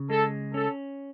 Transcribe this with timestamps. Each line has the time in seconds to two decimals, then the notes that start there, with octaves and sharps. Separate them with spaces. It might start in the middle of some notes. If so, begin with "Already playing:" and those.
Already playing: C#3
0.09 G#3 A4
0.54 C#4 A4